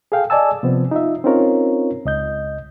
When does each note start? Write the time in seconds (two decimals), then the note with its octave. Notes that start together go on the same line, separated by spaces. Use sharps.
0.12 G#4 A4 F5 G5
0.30 D5 D#5 G#5 A5 E6
0.63 C3 F3 B3 C4
0.91 D#4 F4 E5
1.24 C4 C#4 D#4 F4 A#4 C#5
2.05 C#2 D#5 G6